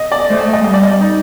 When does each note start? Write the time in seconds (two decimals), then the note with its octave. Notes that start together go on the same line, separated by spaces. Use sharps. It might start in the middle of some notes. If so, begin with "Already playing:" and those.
Already playing: D#5
0.12 D5
0.30 A3 C5
0.41 D5
0.53 D#5
0.64 G3 D#5
0.74 D5
0.83 D#5
0.91 D5
1.01 D#4